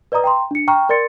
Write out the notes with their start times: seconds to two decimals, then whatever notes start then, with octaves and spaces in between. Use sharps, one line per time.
0.12 B4 D5 D#5 A#5 D#6
0.24 G5 A#5 C6
0.51 D4 C#7
0.68 G5 A#5 C#6 F6
0.89 A#4 D5 C6 A6 C#7